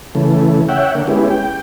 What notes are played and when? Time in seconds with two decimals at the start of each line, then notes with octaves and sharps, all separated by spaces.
0.15 C#3 E3 A3
0.69 C#5 E5 F#5 G5
0.95 D3 A#3
1.07 G#3 B3 C#4 E4 G4
1.31 G5